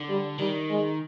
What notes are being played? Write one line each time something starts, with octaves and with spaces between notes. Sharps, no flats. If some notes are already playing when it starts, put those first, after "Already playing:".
Already playing: D3
G3
D#3 G3
G#3